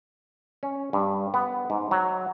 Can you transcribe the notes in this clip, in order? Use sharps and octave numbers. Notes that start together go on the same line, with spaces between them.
C#4
G2
B3
G#2
F#3